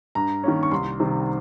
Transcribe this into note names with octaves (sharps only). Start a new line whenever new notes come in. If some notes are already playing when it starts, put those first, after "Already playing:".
G2 A#5
D#3 A#3 C#4
C#6
C2 C6
C3 D#3 G3